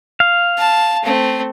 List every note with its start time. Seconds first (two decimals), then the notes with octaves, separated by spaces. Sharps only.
0.20 F5
0.58 A5
1.04 A3 C4